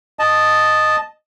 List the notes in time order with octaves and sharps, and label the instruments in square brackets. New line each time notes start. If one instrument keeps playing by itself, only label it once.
[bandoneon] D#5 A5